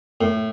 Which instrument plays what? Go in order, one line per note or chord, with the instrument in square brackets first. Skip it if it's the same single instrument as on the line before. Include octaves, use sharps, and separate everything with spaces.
[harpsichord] A2